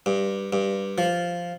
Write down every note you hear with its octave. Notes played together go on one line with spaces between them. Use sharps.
G2
G2
F3